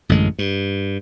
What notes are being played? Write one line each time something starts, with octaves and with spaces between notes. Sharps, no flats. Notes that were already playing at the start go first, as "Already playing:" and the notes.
A1 F#2 D3 G#3
G2